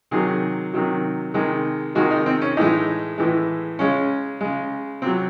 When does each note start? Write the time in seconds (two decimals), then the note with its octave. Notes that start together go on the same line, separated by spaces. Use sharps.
0.11 C3 D#3 F#3 G#4
0.73 C3 D#3 F#3
1.34 C3 D#3 G#3
1.95 C3 D#3 G#3 F#4
2.11 D#4
2.26 C4
2.42 C#4
2.57 A2 E3 G#3 D#4
3.18 A2 E3 G#3
3.79 C#3 G#3 C#4
4.41 C#3 G#3
5.02 C3 F#3 C4